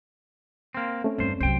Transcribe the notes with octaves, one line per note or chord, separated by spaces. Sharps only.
A#3 C4 C6 F6
A3 C4 C#4
E2 G2 C5
C2 F#3 C5 G5